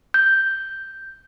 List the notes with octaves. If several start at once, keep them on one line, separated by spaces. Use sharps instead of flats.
G6